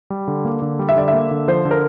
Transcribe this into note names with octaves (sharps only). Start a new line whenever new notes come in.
G3
D3
A#3
D3
G3
E5
D3 D5
E5
A#3
D3
F3 C5
D3
A#4